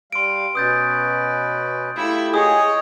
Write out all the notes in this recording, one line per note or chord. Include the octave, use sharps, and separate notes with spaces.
G3 F5 C6 D7
B2 C#4 B4 D#6 G6 A6
A3 E4 F4 G4 E5
G#4 C#5 D#5 D#6